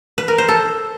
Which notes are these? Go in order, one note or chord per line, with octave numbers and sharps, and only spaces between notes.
B4
A#4
C5
A4